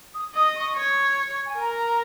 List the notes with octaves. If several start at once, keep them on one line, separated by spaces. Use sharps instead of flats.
D#6
D#5 D#6
C#6
C#5
G#5
A#4 A#5